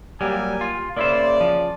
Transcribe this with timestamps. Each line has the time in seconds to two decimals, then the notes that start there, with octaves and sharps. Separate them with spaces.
0.21 F#3 G3 A#3 G4 G#5
0.61 F4
0.97 C#3 A#3 E4 C5 D5
1.41 F3